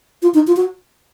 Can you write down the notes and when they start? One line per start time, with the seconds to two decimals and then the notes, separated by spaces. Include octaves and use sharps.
0.22 F4
0.34 D#4
0.47 F4
0.56 F#4